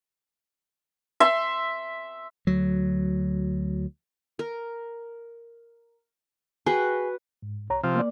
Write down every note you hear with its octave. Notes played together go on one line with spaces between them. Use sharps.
E5 C6
D2 F#3
A#4
F#4 G#4 B4 G5
G#2
C2 C#5 A#5
C3 F3 F6
A#3 D5